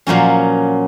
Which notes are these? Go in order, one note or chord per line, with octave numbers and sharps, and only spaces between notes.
A#2 F3 F#3 C#4